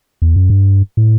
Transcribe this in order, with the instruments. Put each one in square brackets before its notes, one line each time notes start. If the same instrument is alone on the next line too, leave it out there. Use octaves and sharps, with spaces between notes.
[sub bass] E2
F#2
G2
A2